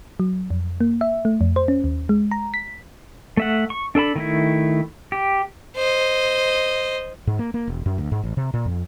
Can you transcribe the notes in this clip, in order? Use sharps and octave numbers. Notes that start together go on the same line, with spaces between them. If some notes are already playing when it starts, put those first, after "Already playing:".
F#3
F2
A#3
E5
A3
F2
C5
C#4
D#2
G#3
A#5
B6
A3 E5 F#5
C#6
D4 A4 A5 B5
D#3 A3 E4
G4
C5 D#5
G#2
A#3
A#3
E1
F#2
D2
G#2
A1
C3
A#2
F2